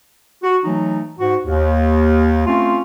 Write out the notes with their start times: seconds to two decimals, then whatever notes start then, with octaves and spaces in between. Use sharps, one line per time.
0.44 F#4
0.64 E3 F#3 A3 D#4
1.19 G#2 F#4
1.46 D#2
2.47 A3 C4 C#4 F4